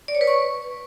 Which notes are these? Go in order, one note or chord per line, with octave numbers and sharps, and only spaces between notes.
D5
C#5
B4
C#6